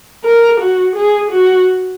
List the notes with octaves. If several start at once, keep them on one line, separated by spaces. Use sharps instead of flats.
A#4
F#4
G#4
F#4